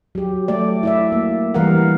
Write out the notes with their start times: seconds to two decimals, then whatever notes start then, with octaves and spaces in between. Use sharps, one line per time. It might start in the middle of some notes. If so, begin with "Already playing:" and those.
0.15 F#3 G4
0.48 F#3 A3 D5
0.83 E4 D5 E5
1.12 A#3
1.54 E3 G3 A#4 F5 F#5